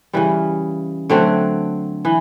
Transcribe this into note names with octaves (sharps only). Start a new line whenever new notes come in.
C#3 E3 G3
D3 F#3 A3 C4
E3